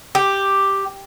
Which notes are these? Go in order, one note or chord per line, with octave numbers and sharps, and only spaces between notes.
G4